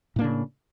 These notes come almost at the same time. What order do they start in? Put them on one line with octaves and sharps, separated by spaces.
A2 A#3 D4 C#3